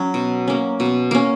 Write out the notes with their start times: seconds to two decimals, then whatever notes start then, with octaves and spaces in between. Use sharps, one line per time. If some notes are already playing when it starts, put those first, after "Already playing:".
Already playing: F#3 C#4
0.14 B2
0.48 A#3 C#4
0.80 B2
1.11 A#3 C#4